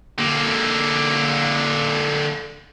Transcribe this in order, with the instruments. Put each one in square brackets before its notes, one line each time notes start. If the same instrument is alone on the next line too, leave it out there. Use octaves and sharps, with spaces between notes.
[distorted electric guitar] D3 A#3